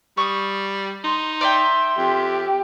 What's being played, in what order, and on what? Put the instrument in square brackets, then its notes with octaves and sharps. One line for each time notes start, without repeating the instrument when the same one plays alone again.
[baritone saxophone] G3 [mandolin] C#6 D#6
[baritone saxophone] D#4 [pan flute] C6
[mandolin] D5 E5 G5 [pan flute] C6
[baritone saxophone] F2 [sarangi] G4